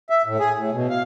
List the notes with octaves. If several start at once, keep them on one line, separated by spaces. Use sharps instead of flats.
E5
A2
G#4
A2
B2
F5